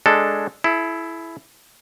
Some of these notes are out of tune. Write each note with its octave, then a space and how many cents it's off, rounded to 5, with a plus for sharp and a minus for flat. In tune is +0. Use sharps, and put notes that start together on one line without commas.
G#3 +0 D4 +0 A4 +0
E4 +5 A4 -45